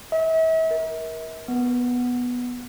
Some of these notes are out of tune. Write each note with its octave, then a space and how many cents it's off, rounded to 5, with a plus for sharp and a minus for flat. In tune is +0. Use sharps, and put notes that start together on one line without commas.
E5 -40
A#4 +25
B3 -5